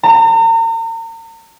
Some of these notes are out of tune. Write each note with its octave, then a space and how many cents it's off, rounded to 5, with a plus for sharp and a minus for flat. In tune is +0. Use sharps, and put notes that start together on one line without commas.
A#5 -40